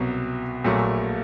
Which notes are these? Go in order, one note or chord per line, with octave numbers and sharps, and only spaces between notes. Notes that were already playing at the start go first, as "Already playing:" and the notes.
Already playing: C2 B2 F#3
A#1 A#2 F#3 A3